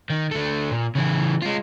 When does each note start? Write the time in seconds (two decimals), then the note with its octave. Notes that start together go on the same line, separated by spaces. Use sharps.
0.10 D#3
0.31 D3 A3
0.71 A#2
0.95 C#3 E3
1.42 G#3 F4